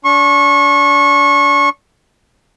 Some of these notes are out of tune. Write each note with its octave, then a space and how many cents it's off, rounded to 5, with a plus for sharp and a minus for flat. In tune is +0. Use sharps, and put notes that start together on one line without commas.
D4 -35 C#6 -25